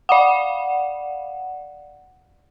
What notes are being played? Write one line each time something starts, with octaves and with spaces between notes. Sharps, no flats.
D5 F5 F#5